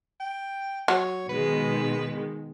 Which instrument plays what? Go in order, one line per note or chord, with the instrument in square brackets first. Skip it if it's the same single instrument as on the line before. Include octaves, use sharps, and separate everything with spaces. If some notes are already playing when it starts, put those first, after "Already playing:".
[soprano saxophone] G5
[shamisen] F#3 [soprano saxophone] C#5
[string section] B2 D#3 G#3 [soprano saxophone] B4